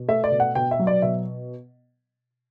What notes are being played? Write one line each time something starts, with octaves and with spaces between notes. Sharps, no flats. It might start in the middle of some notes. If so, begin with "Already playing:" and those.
Already playing: B2
A3 E5
D5
B2
F#5
B2 G5
E5
F#3
D5
B2 E5